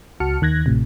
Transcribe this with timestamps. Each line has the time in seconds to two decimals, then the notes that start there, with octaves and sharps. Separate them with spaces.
0.20 C#2 F#4 A5 F6 C#7
0.41 D#2 D#3 F#6 G#6 A#6
0.66 A1 A2 C3